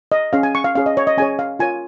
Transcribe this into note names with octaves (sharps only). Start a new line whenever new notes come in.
D#5
C#4 G#4 C#5 F5
G#5
C#6
F5
C#4 G#4 C#5 F5
D#5
C#5
D#5
C#4 G#4 C#5 G#5
F5
F4 A#4 C#5 G#5